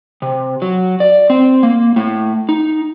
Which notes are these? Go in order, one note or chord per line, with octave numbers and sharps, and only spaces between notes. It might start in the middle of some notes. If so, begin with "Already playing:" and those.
C3
F#3
D5
C4
A#3
A2
D#4